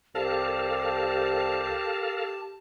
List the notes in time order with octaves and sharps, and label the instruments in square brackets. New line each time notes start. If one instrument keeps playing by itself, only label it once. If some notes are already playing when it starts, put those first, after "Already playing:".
[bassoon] C2 [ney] G4 [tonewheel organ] A4 A#4 F5 [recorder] A5